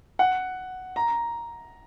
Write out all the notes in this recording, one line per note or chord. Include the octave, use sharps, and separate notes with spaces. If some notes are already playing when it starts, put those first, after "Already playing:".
F#5
A#5